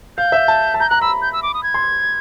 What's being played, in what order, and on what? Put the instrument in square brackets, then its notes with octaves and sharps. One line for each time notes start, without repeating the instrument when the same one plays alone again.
[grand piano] F5 [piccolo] G6
[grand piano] E5
A5
A5
[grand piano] A#5 [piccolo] G6
[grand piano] A#5 [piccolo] F#6
[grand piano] B5 [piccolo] E6
[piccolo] G6
E6
D6
D#6
G#6
[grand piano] C6